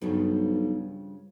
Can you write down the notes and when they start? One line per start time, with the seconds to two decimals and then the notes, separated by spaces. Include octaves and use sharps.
0.02 B1 G2 C#3 F3